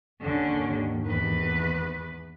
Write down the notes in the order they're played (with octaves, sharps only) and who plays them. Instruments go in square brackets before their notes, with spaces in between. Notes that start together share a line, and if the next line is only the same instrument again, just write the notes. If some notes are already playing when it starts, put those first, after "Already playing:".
[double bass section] G#1 D#2 D#3 [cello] D3 C#4
[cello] E2 B4